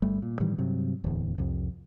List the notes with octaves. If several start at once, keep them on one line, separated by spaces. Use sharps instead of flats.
G1 G3 A3
A#2
A2 D#3 E3 G3
G2 C3 F#3
D1 E2
C2 F2